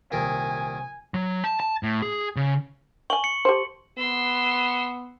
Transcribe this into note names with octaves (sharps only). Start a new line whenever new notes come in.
C2 A#2 D#3 G#5
F#3
A5
A5
A2
G#4
C#3
G5 G#5 C#6 F#7
C#7 F#7
G4 A4 C5
B3 C6 E6